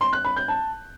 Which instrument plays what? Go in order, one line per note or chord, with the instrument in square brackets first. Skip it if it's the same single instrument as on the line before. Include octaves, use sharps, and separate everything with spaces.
[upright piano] C6
F#6
B5
G6
A5